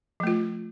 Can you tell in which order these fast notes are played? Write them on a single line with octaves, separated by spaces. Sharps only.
F3 A3 F4